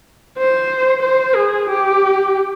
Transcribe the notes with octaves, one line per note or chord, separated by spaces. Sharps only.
C5
C5
G#4
G4